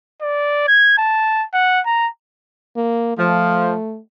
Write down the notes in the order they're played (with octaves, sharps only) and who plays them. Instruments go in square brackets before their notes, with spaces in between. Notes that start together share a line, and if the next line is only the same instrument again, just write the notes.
[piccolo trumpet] D5
G#6
A5
F#5
A#5
[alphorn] A#3
[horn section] F3 [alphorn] A3